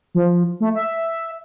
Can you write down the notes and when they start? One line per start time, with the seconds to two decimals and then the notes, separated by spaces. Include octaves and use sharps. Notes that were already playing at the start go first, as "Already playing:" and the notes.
0.15 F3
0.60 A3
0.75 E5